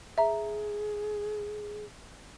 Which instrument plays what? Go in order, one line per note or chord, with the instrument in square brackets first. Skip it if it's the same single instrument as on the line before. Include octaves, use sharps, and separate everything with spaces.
[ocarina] G#4 [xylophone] E5 A#5